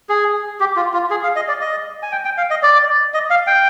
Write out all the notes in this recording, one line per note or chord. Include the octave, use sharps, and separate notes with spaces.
G#4
G4
F4
F4
G#4
F5
D#5
D5
D#5
G#5
G5
G5
F5
D#5
D5
D#5
F5
G5